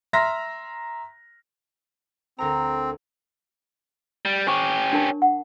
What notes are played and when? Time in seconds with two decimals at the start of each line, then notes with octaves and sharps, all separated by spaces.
0.13 E5 A#5 C6 F6 A#6
2.39 D2 C4 A#4 A#5
4.25 G3
4.47 C#4 G4 C5 C#6
4.93 D4 A#4 A5
5.22 F#5